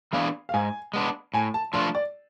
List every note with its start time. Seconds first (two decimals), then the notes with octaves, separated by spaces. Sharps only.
0.13 E3 B3 D4 G#4 F5
0.49 F5
0.54 G#2 G#5
0.94 G#3 B3 D4
1.34 A2 G#5
1.54 A5
1.73 F3 A3 D4 F4 C6
1.95 D5